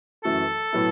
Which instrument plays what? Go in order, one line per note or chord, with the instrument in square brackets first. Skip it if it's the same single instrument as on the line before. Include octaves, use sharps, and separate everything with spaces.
[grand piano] F#2 E3 A3 F#4 [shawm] A4
[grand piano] A2 F#3 B3 E4